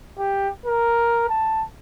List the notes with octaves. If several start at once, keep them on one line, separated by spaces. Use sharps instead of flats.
G4
A#4
A5